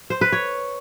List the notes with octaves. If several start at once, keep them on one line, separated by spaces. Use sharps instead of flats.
C5
B4
C#5